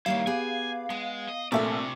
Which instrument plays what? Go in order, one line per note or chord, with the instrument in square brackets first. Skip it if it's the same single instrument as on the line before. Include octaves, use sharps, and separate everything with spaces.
[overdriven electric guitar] D#3 E4 [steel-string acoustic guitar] G3 A#3 C#5 [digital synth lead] F5
[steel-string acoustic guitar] B3 G4 G#4 [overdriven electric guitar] G#5
[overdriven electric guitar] G#3 [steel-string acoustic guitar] B3
[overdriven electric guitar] D#5
[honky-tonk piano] A#1 A3 E5 [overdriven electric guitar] C3 D5 [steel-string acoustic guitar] C4 A#4 F5